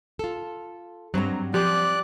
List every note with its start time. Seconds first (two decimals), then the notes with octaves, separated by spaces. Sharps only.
0.19 F4 A4
1.14 G2 F#3 G3 C4 A#5
1.54 F3 G4 D5 F#6